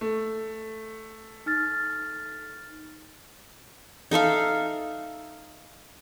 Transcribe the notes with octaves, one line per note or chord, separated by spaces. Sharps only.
A3
D#4 F6 A6
D#4 A4 E5 F5